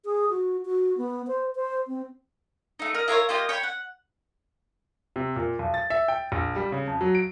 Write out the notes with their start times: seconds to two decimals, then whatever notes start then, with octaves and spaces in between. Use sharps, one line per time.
0.05 G#4
0.30 F#4
0.65 F#4
0.98 B3
1.28 C5
1.55 C5
1.87 C4
2.79 A3 D#4
2.94 A#4 D#5 F6
3.08 E4 F4 A#4 C#5
3.29 A#3 F4 G4 D#5
3.49 C#5 G5 B5
3.63 F#5
5.16 C3
5.36 A#2
5.59 B1
5.74 A6
5.90 E5
6.08 G5
6.32 A#1
6.56 G3
6.72 C#3
6.87 F2
7.01 F#3
7.15 D7